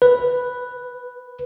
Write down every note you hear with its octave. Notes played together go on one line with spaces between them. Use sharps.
B4